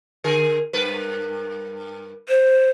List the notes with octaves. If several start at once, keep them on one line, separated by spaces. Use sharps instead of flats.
D3 G#4 A#4
G2 A#4 B4
C5